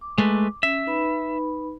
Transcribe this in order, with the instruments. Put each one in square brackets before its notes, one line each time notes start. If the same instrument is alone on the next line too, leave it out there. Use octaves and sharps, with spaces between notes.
[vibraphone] D6
[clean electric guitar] G#3 A3 B4
[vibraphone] C#4 [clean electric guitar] E5
[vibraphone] D#4 B4 B5